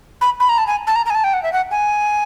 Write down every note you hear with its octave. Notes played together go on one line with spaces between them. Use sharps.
B5
B5
A#5
A5
G#5
A5
A#5
A#5
G#5
A5
G5
F#5
E5
F#5
G#5